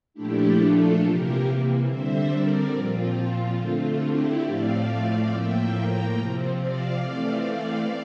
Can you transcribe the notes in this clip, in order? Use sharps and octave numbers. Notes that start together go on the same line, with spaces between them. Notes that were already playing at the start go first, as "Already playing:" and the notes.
A#2 F3 A3 D4 E4 G4
F4 A4
C3 E3 A#3 G4 A#4
D3 G3 C4 C5 E5
A#4 D5
A#2 F3 C4 F4
D3 A3 C4
E4 G4
A2 F3 A3 C4 D5 F5
A2 F3 A#3 E5 G5
G5 A#5
C3 F3 C4
D5 F5
E3 A3 C4